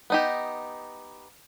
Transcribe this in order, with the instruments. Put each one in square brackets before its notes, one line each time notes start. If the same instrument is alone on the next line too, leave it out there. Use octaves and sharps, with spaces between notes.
[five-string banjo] B3 D#4 G4